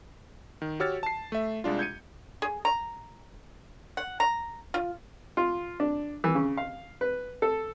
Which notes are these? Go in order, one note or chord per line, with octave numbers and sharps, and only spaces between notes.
D#3
F#4 G4 C#5 E6 F6 A6
A5 C7
A3 E5
C2 G#3 D4 F4
G6 G#6 C#7 D#7
G#4
A#5
F#5
A#5
F4
F4
D4
E3
C#3
F5
B4
A4